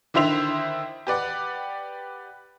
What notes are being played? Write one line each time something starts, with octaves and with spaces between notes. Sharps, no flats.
D3 D#3 E4 C5 E5 F7
G4 B4 D5 F#5